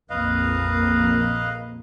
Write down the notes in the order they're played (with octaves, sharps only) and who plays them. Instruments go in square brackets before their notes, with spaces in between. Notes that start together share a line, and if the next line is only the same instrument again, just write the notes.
[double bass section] A#1 F2 A#3 [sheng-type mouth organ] B4 D#5 F5